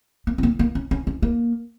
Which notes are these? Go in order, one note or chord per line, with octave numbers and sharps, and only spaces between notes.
A#3
C4
A#3
A#3
C#4
C#4
C#4
A#3